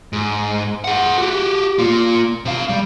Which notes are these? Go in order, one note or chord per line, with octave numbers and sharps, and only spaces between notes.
G#2
G#4 F#5
F#4 G4
A#3 F4
C3 F5
G3